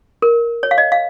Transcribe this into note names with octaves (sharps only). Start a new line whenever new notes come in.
A#4
C#5
F5
D#5
F5